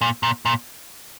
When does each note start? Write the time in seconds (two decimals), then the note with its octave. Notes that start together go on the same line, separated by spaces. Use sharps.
0.01 A#2
0.23 A#2
0.45 A#2